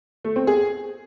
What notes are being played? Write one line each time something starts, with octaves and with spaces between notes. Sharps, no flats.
A3
C4
G#4